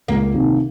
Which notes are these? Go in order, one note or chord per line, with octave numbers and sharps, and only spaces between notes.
C#2 A#3
C3 D#3